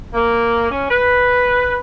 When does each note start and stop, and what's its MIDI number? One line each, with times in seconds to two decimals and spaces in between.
0.14 0.69 58
0.71 0.90 61
0.91 1.77 71